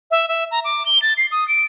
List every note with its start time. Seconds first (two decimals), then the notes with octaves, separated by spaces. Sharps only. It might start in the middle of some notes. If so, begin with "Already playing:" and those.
0.11 E5
0.29 E5
0.51 A#5
0.64 D6
0.86 G7
1.02 A6
1.17 C7
1.32 D#6
1.48 D7